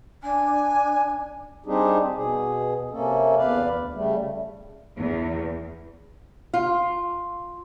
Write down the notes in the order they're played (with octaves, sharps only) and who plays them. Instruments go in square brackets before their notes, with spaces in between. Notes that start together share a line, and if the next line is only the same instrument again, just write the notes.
[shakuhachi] D4 [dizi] G#5
[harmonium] G3 C4 D4 D#4 G4 G#4
B2 G#4
C3 A#3 C#4 A4
E2 B4 D5 F5
D2
C#3 G3 A3
[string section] E2
[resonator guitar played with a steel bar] F4